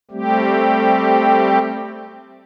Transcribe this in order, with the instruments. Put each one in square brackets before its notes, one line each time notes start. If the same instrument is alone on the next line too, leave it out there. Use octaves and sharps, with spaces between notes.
[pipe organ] G3 A3 C4 G4